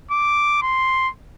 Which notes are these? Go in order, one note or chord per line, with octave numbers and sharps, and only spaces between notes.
D6
C6